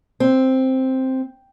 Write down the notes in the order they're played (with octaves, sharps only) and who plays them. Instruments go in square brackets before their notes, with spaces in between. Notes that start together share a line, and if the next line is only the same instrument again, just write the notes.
[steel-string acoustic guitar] C4